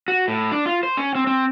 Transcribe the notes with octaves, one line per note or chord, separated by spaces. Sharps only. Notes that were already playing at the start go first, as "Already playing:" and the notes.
F#4
A2
D4
F4
C5
C#4
C4
C4